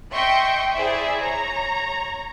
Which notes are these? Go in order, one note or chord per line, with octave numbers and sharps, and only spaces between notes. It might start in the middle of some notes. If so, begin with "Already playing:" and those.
D#5 E5 G5 C6 C#6 G6
E4 G#4 C5 D5 E5
C#5 A#5